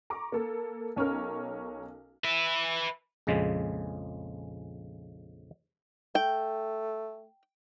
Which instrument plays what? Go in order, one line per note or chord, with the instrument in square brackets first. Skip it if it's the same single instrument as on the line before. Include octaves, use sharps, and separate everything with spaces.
[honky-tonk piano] A#5 C#6 D6
A#3 A4
B1 C#4 A#4 F6
[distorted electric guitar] B4 E5
[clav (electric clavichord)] A#1 F2 C#3 G#3
[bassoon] A3 [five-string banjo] G5